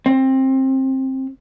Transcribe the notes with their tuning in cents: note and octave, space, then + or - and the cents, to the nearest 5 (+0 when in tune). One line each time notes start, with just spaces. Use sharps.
C4 +20